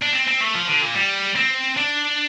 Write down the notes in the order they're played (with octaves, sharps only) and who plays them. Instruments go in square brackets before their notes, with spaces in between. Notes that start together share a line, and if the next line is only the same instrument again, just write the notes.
[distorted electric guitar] D4
C4
C4
A3
F3
D3
A#2
G3
C4
D4